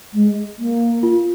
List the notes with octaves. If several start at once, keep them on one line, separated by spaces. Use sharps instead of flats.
G#3
A#3
F4